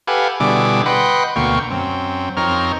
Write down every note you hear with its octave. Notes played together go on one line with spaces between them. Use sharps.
G4 A4 B4 F5 F#5 G#5
B2 D3 G3 E4 G#4 D6
B4 D#5 F#5 G5 B5 C6
D2 B2 A#3 F5 G5 C#6
F#2 C4
F2 C4 D#4 A#4 C#5 F6